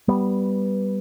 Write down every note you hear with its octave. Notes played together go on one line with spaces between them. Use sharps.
G3 B3